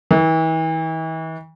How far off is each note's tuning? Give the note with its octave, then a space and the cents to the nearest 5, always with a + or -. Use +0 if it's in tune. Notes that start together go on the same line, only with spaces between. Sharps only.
E3 -40